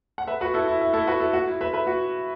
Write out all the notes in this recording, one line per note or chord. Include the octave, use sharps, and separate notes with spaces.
F#5
B4 E5
F#4 B4
E4 A4
E4
E4
E4 A4
F#4 B4
E4 A4
F#4
E4
B4 E5
B4 E5
F#4